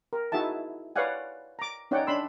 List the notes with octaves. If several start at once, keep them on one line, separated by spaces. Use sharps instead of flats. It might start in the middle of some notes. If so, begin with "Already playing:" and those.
A#4
D#4 E4 F#4 G#4 E5 A5
B4 C#5 D5 F5 F#5 G#5
A#5 D6
C#4 D#4 C#5 D5 F#5 G5
D4 B5 C6 E6